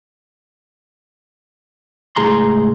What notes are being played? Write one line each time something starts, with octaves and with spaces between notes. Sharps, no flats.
C#2 A2 G#4 A#5 C6